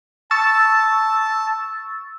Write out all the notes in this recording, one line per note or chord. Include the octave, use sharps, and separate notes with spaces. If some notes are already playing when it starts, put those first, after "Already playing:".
A5 C#6 E6 A6